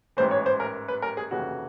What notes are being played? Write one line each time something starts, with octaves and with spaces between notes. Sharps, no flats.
A1 G#2 E3 C5
C#5
C5
A#4
B4
A#4
G#4
F1 D#2 C#3 E3 F#4